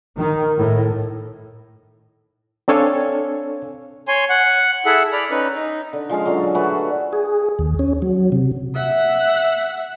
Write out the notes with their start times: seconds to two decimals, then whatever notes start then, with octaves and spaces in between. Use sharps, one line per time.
0.16 D#3
0.58 A2
2.68 C4 D4 A4 C#5 F5 G#5
4.08 C#5 G#5 C6
4.29 F#5
4.85 E4 G#4 A4 E5 F#5
5.12 D5 B5 F6
5.31 C#4 D#4 B4
5.55 D#4
5.93 D3
6.10 F3 G#3 C#4 F5
6.26 D3 F3 F#3
6.39 A4
6.55 A3 F#4 G#4 B4
7.13 G#4
7.59 D#2
7.79 C#4
8.02 F#3
8.32 C3
8.75 E5 F#5